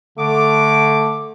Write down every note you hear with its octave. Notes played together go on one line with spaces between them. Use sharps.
D3 A3 D6